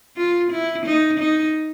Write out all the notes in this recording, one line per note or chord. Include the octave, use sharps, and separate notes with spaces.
F4
E4
D#4
D#4